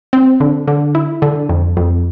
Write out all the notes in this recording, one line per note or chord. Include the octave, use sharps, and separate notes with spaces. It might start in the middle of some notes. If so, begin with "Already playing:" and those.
C4
D3
D3
E4
D3
F2
F2